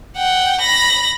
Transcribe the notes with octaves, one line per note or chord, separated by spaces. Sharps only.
F#5 G5
B5 A#6